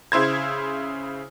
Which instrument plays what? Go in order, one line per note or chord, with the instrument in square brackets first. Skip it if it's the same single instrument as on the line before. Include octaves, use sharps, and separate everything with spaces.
[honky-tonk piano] C#3 E4 C5 G#6